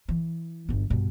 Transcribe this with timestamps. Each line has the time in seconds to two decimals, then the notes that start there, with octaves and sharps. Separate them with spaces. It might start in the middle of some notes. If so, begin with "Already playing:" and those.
0.09 E3
0.69 G1 F#3
0.90 G2 B2